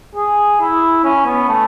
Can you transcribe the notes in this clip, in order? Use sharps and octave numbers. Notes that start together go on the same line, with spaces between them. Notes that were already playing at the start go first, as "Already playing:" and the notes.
G#4
E4
C#4
B3
A3